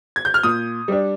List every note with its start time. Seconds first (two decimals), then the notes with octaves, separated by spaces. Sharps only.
0.16 G#6
0.25 G6
0.34 F6
0.43 A#2 D#6
0.88 G3 D4